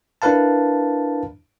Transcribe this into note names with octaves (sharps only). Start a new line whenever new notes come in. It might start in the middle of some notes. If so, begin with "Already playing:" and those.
D4 E4 A#4 B4 F5 A5